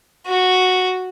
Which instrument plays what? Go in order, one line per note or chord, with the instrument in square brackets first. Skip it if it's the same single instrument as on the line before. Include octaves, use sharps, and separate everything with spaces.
[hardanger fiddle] F#4